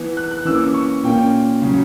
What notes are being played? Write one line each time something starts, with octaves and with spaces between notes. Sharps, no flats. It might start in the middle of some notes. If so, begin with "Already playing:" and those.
Already playing: E3 B3
F#6
F#6
E3 A#3 C#4 E6
D6
E6
C#6
A#2 A#3 C#4 G5
C#3 F#3 C#4